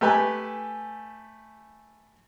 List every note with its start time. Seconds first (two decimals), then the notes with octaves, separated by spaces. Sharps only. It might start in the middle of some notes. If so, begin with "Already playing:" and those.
0.01 A3 G4 B4 G#5